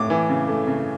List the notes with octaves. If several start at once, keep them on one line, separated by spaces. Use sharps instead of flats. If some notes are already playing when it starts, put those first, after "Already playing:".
Already playing: A2 D6
E3
C#3
A3
C#3